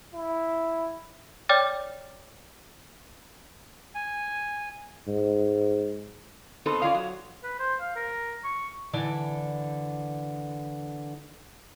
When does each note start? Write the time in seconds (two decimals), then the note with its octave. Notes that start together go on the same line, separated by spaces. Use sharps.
0.13 E4
1.49 C#5 D5 G5 D6 F6 A6
3.95 G#5
5.07 G#2
6.66 B3 C4 D#4 A4
6.82 C#4 F4 D5 D#5 F5
6.94 F#3
7.44 B4
7.59 C5
7.81 F5
7.96 A#4
8.44 C#6
8.93 D3 E3 D5